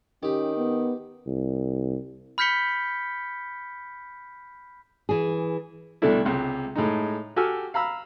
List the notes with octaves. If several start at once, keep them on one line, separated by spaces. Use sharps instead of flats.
D#3 C#4 G4
B3
C2
B5 F6 G6 B6 C#7 G7
E3 G#4
C2 B2 D3 A3 D4 E4
C#2 C3
A2 G#3 D#4
F#4 G4 A4 G#5 E6 F6
F5 A#5 B5 E6